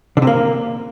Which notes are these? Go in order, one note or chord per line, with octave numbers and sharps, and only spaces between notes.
D3
C3
A#3